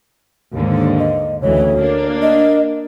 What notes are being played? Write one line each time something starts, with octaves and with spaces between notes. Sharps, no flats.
D#2 G#2 D3
D#5
D2 C#3 E3 C#5
A#3 D4
D#5